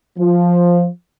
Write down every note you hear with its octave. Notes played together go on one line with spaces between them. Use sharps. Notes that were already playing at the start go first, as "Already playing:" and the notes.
F3